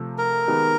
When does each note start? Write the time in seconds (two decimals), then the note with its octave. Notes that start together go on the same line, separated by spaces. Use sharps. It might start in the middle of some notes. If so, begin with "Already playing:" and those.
Already playing: C3 F3 A3
0.18 A#4
0.47 D#3 G#3 B3 D#4 G4